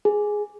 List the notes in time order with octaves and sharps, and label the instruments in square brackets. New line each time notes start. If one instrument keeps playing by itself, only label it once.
[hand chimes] G#4